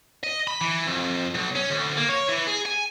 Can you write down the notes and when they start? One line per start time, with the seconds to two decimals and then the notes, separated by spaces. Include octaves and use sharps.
0.24 D#5
0.47 B5
0.61 E3
0.87 F2
1.34 B1
1.55 C#4
1.70 D2
1.97 A#3
2.09 C#5
2.29 E3
2.47 G#4
2.66 G#5